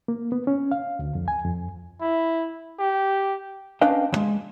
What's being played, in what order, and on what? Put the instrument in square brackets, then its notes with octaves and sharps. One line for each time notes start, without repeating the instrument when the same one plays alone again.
[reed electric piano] A#3
B3
C#4
F5
D2
F2
G#5
F2
[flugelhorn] E4
G4
[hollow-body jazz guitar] C#4 D4 B4 D#5 F5 G5
E2 G#3